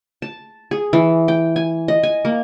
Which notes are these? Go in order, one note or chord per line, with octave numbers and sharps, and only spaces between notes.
A5
G#4
E3
G5
G#5
D#5
G#5
A#3